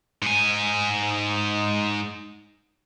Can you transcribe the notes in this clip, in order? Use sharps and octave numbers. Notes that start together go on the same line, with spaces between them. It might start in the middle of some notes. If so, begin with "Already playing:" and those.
G#2 G#5